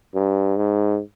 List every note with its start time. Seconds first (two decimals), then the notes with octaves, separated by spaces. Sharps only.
0.15 G2
0.56 G#2